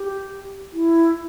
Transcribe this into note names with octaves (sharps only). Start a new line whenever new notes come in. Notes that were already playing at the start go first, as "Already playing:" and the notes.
Already playing: G4
E4